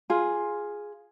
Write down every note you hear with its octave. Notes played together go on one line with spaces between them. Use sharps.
F4 G#4